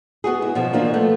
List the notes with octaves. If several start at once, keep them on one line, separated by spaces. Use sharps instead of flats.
B3 F#4 G#4
E4
B2 F3
E3 F3 A#3 D4
F3 A3 B3